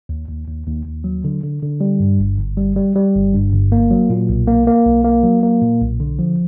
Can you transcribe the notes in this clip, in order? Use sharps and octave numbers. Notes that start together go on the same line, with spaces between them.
D#2
D#2
D#2
D#2
D#2
F#3
D3
D3
D3
G3
G2
G1
G1
G3
G3
G3
G1
G2
G1
A#3
F#3
A#2
B1
A#3
A#3
B1
A#3
F#3
A#3
A#2
B1
D3
F3